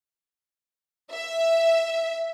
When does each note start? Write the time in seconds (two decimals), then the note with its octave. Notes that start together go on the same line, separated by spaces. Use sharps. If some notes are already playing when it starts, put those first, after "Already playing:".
1.11 E5